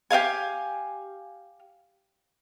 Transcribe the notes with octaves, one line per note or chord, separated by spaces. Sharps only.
G4 C#5 F5 G#5